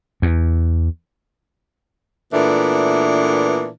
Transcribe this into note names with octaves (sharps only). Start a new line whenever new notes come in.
E2
A#2 E3 A3 B3 D4